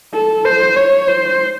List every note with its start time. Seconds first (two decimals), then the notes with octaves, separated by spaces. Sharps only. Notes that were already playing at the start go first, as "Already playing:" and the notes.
0.13 A4
0.45 C5
0.76 C#5
1.08 C5